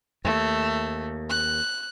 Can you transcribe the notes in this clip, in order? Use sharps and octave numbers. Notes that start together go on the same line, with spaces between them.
D#2 A3
F#6